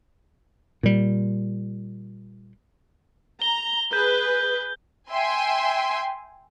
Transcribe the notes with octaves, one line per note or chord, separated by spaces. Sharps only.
A#2 G3
A#5 G7
G#4 B4 G6
E5 G5 G#5 C6